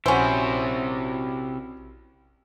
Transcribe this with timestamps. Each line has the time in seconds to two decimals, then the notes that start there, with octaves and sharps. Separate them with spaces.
0.06 A#1 C3 C#4 E4 F#4 C5